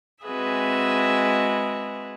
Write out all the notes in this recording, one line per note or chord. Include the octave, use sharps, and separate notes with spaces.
G#3 C4 F#4 G#4 B4 E5